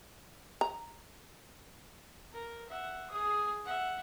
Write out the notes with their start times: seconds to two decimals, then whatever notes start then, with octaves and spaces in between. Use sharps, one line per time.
0.61 A#5
2.33 A#4
2.70 E5 F#5
3.11 G#4 D#6
3.65 E5 F#5